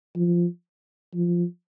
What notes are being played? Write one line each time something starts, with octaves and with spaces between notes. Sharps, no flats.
F3
F3